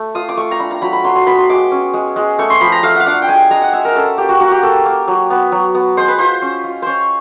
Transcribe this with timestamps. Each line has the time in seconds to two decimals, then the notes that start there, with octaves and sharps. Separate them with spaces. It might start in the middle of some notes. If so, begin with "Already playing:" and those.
Already playing: A3
0.15 F4 D#6
0.29 D6
0.37 A3 C#6
0.51 A#5
0.59 D4 B5
0.71 A#5
0.82 F#3 B5
0.93 B5
1.04 F#3 C6
1.16 C6
1.26 B3 B5
1.38 C6
1.49 G#3 D6
1.71 C#4
1.94 G#3
2.16 G#3
2.39 A3 C#6
2.50 C6
2.61 F3 B5
2.72 A#5
2.83 A3 F5
2.95 F#5
3.00 F5
3.06 D4 F#5
3.22 G5
3.28 G#3 G#5
3.51 G#3 A#5
3.62 F#5
3.73 G#3 E5
3.85 A#4
3.95 C#4 A4
4.18 A#3 G4
4.29 F#4
4.41 A#3 F#4
4.51 G4
4.63 A#3 A4
4.86 A#3
5.08 F#3
5.30 B3
5.52 F#3
5.75 B3
5.97 G#3 C5
6.08 B4
6.18 F4 C5
6.42 C#4
6.64 F4
6.82 C#4 C5 C#5